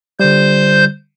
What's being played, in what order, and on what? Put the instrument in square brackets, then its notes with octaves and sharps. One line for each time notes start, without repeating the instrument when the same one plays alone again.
[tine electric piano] D3 G3 [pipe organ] C5 G6